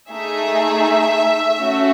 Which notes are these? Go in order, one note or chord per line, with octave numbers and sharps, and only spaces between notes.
A3 D#4 G#4 E5
A3 C#4 F#4